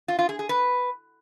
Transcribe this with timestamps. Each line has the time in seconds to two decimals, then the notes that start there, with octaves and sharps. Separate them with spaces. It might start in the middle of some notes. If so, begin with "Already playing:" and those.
0.08 F4
0.19 F4
0.29 G#4
0.39 G#4
0.49 B4